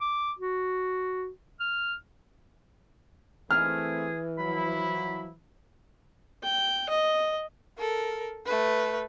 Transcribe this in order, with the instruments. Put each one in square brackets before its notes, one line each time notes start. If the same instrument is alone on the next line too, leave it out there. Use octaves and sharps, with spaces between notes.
[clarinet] D6
F#4
F6
[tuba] E3 [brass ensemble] A3 C4 E4 [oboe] G#4 [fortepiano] F6
[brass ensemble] F3 F#3 E4 [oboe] B5
[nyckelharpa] G5
D#5
[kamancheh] A4 A#4
A3 B4